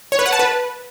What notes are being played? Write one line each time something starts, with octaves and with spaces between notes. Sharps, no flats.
C#5
B4
F#5
A5
B4